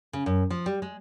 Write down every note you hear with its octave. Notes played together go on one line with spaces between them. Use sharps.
C#3
F#2
F3
G3
G#3